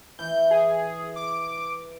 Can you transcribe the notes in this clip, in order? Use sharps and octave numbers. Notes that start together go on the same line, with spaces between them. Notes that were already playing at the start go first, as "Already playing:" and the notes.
E3 G6
G#4
D6